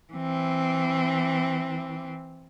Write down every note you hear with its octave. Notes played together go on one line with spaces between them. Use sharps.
E3 C4